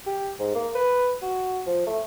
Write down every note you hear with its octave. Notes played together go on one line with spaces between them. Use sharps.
G4
G#2
A#3
B4
F#4
F3
A3